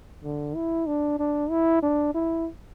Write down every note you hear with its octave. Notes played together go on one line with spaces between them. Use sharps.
D3
E4
D4
D4
E4
D4
E4